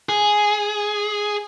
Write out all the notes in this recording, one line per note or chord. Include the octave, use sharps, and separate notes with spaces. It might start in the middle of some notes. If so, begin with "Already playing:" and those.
G#4